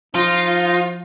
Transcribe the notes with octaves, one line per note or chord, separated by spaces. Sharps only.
F3 D#4 F4